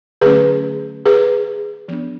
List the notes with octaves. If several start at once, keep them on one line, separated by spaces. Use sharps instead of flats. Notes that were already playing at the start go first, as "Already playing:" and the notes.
D3 F#3 A3 C#4 G#4 B4
G#4 B4
F3 B3 D4